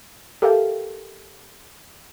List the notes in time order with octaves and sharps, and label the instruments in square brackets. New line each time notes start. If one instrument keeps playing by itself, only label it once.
[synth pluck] G4 A4 A#4 E5 F5 G5